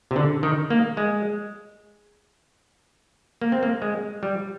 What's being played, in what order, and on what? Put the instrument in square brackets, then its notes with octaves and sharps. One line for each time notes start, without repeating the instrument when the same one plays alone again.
[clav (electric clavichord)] C3
D3
D#3
A#3
G#3
A#3
C4
A#3
G#3
G3